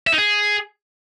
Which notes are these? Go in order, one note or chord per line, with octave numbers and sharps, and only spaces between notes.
E5
D#4
G#4